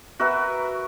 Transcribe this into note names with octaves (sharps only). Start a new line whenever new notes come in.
F#4 A#4 B4 E5